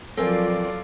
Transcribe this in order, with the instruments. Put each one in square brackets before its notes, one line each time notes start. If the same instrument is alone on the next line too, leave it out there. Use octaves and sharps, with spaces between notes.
[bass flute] F3 [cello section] F#3 F4 D5 [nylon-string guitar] C4 A#4 G#5 [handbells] A4